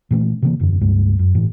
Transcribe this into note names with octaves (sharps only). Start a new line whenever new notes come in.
A#2 E3 A3 C#4
C3 E3 A#3
E1 F#2 D3
C#2 G2 G#3
F#2
G1 A2 E3